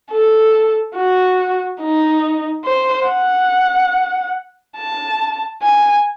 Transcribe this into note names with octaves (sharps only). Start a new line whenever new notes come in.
A4
F#4
D#4
C5
F#5
A5
G#5